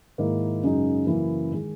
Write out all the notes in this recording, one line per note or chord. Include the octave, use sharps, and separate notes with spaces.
G#2 D#3 A#3 E4
F#2 C#3 G#3 D#4
F#2 C#3 E3 A#3 E4
D#3 G#3